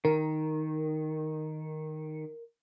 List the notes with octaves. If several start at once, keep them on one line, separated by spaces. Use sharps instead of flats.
D#3 A#4